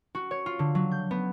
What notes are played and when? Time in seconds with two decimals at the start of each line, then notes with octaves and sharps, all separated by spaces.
0.15 F#4
0.31 C#5
0.46 F4
0.59 D3
0.75 F#3
0.91 G6
1.11 B3